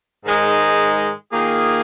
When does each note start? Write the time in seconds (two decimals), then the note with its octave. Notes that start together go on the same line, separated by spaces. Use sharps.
0.25 G#2 D#3 G#3 D#4
1.32 D#3 A#3 F4 G#4